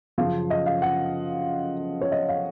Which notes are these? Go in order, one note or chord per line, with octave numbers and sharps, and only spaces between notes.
F#2 C#3 F3 F5
D#5
F5
F#5
C#5
D#5
F5